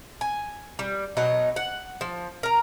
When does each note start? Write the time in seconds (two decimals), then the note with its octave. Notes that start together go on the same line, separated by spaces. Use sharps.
0.21 G#5
0.79 G3
1.17 B2 F#3 D#4
1.56 F#5
2.01 F3
2.43 A#4 A#5